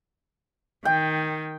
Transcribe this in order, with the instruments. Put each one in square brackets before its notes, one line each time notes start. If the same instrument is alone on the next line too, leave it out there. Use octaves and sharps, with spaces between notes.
[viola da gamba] D#3 [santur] G5